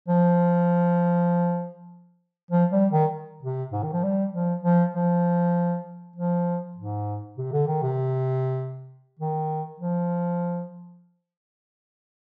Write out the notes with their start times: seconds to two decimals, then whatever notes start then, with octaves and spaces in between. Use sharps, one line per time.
0.08 F3
2.51 F3
2.72 G3
2.91 D#3
3.43 C3
3.72 G#2
3.83 D#3
3.92 F3
4.03 G3
4.33 F3
4.63 F3
4.94 F3
6.16 F3
6.76 G#2
7.38 C3
7.52 D3
7.67 D#3
7.83 C3
9.19 D#3
9.80 F3